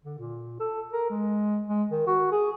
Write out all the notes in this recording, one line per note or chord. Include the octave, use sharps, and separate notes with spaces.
D3
A#2
A4
A#4
G#3
G#3
D#3
F#4
G#4